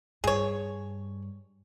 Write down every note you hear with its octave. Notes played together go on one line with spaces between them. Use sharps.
G2 G#4 C#5